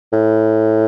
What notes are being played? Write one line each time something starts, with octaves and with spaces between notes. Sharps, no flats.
A2